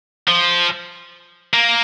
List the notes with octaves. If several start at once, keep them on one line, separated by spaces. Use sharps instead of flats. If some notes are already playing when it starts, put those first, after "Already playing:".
F3
A#3